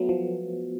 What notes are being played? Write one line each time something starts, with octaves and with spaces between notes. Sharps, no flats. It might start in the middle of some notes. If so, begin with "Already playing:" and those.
Already playing: F#3 A3 B3
F3